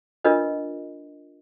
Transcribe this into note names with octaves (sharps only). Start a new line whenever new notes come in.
D4 F4 A#4 B4 D#5